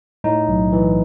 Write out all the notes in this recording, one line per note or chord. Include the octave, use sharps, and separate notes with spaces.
A2 D#4
B1
E3